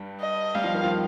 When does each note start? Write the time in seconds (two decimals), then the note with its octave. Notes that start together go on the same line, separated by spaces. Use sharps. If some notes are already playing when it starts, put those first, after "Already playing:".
Already playing: G2 G3
0.21 D#5
0.54 G3 F5
0.64 F3
0.74 D#3
0.84 F3